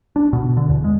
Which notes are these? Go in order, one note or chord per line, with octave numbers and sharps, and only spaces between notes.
D4
B2
D3
E2
G#3